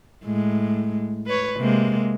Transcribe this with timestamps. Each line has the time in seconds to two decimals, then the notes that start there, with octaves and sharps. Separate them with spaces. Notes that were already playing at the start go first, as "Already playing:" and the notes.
0.24 A2 G#3
1.27 B4 C#5
1.58 C3 G#3 A#3